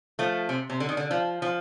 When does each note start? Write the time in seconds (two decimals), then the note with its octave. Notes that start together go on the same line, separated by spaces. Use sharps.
0.19 F3 A3
0.49 C3
0.70 C3
0.80 D3
0.89 D#3
0.97 D3
1.11 F3
1.42 F3